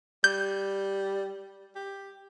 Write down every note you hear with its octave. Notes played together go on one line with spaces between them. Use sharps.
G3 G6
G4